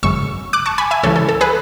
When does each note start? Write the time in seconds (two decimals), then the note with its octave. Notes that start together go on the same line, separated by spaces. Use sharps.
0.03 G#1 F#2 C#3 C#6 E6
0.53 D6 F#6
0.66 A5 C#6
0.78 G#5 B5
0.91 E5 G#5
1.03 C#2 C#3 E3 A4 C#5
1.16 A4
1.29 A4
1.41 G#4 B4